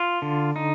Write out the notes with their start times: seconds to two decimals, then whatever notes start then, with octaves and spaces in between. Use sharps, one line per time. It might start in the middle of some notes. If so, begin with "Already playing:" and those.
Already playing: F4
0.22 D3
0.56 D#4